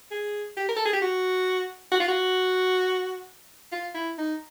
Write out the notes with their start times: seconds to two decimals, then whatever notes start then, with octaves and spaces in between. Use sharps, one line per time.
0.11 G#4
0.57 G4
0.69 A#4
0.77 A4
0.85 G#4
0.93 G4
1.02 F#4
1.92 F#4
2.00 F4
2.08 F#4
3.72 F4
3.95 E4
4.18 D#4